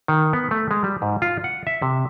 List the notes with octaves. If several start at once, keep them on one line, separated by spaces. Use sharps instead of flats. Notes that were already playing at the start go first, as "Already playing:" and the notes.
D#3
B3
A3
G#3
G3
G#2
F4
F#5
E5
C3